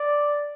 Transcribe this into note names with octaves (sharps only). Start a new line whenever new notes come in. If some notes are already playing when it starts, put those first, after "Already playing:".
Already playing: D5